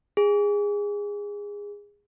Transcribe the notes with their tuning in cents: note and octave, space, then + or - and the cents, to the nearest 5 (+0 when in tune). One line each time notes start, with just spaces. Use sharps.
G#4 -20